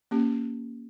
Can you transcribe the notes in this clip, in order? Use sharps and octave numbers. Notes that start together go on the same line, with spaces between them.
A#3 C#4 G4